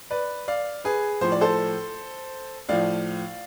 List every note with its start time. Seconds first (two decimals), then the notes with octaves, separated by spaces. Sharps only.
0.11 B4 D5
0.48 D5 F5
0.84 G#4 B4
1.21 A2 F3 C5
1.32 D5
1.41 A4 C5
2.69 A2 F3 D5 F5